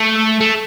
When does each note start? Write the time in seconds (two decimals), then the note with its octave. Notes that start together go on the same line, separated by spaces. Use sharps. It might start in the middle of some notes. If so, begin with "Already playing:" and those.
Already playing: A3
0.41 A3